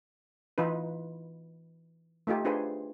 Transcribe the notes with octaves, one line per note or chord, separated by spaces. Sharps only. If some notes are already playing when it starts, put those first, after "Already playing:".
E3 D#4 F4 B4
A3 D#4 F4 G4
D4 F4 G#4 B4 C5